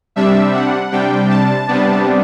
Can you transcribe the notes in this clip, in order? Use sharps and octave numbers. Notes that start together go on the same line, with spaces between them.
C3 G3 D4 E5
F#5
C3 G3 D4 G5
A5
C3 G3 B3 D4